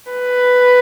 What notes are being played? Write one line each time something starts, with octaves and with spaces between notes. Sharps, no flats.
B4